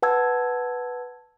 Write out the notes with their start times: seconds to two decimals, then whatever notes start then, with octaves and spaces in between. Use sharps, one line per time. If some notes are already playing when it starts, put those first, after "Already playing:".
0.02 B4 F#5 A5 E6 G#6